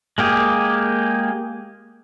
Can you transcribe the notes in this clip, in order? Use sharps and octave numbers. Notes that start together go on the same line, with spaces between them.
G#3 A#3 G4 G#4